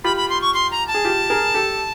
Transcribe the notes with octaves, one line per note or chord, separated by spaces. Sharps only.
F4 G4 B5
B5
C6
C#6
C6
A#5
A5
G#4
F4 G4
G#4 A#4
G4 A4